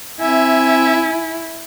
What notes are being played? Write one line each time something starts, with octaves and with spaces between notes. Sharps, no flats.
C4 E4 E5 G#5